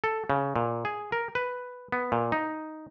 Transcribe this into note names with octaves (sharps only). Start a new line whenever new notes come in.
A4
C#3
A#2
G#4
A#4
B4
B3
A#2
D#4